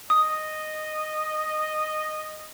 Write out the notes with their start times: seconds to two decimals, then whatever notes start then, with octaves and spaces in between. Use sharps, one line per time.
0.10 D#5 D#6